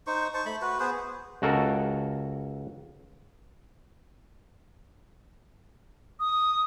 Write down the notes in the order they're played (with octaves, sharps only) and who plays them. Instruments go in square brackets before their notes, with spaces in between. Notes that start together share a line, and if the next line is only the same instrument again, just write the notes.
[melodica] D#4 C5 C#6
C5 A5 C#6
A3 B5
F#4 B4
B3 G#4 B4 C5
[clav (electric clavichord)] C#2 F#4 A4 A#4
[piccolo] D#6